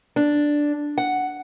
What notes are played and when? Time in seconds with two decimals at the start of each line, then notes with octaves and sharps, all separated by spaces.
0.16 D4
0.98 F#5